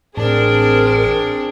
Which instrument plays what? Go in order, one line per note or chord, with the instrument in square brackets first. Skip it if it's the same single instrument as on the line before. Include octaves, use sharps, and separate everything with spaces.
[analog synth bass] A1 [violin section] C4 D4 [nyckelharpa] G#4 [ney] A#4